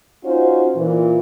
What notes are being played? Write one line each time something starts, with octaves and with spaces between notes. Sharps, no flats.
C#4 D#4 F4 F#4 C5
A#2 E3